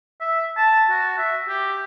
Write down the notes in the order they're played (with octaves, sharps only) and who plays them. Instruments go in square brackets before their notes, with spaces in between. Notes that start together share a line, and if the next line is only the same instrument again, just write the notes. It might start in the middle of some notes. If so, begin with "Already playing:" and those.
[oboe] E5
A5
F#4
E5
G4